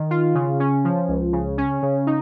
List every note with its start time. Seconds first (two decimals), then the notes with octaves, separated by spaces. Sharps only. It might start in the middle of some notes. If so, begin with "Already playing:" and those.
Already playing: D#3
0.10 F4
0.35 C#3
0.60 C#4
0.84 F3
1.08 C#2
1.33 C#3
1.58 C#4
1.82 C#3
2.07 D#4